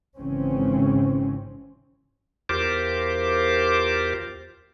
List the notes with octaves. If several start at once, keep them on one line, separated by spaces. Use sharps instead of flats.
G#1 C#3 E3 C4 C#4
E2 F4 G4 A#4 C5 D6